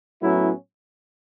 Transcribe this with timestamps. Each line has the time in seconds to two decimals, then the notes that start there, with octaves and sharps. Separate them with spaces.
0.20 A2 F#3 B3 C#4 E4